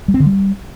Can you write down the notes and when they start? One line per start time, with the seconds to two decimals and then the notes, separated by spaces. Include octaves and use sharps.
0.08 G3
0.14 C4
0.20 D3
0.26 G3